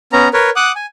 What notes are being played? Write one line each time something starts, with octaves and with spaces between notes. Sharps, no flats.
B3 C#4 A#5
A#4 B4 C#5
F#5 D6 D#6 F#6
G#5